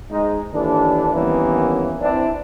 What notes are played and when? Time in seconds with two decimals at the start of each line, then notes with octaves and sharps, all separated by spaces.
0.11 G#2 G#3 D#4
0.53 D#2 D3 E3 D4
1.13 G2 D#3 E3 A#3 B3 C#4
2.02 C4 D4 E4